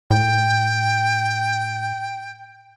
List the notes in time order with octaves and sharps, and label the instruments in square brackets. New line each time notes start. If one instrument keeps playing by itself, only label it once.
[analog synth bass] A2 [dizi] G5